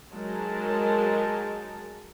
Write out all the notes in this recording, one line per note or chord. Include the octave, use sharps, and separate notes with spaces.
F#3 G#3 D#4 A#4 A5